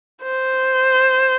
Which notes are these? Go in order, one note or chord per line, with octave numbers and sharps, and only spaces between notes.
C5